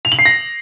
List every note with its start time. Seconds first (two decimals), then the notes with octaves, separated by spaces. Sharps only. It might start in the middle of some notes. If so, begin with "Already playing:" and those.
0.05 F7
0.12 F#7
0.19 C7
0.25 A#6